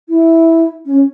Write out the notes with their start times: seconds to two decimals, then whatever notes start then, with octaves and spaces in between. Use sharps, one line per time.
0.08 E4
0.85 C#4